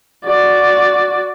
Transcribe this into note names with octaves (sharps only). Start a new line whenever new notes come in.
F#4 D5